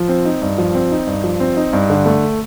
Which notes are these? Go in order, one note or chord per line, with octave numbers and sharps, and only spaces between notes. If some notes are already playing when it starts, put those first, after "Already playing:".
Already playing: F3
C4
D#4
G2
F3
C4
D#4
G2
F3
C4
D#4
G2
D3
A3